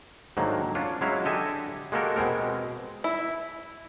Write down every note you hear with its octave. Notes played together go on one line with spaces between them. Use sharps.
G#2 D3 D#3 F#3 A#3
C#4 D4 F4
F#3 G#3 C#4 E4 F5
D3 G4 A4 D#5 E5 G#5
G#3 A#3 F#4 G4 A4 A#4
B2 G#3 C4 A#4
E4